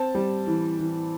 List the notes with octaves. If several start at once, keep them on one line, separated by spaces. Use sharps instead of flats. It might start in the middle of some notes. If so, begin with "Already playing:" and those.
Already playing: C4 A5
G3
E3
E3